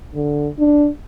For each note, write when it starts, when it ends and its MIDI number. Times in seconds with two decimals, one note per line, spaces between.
0.15 0.48 50
0.59 0.88 62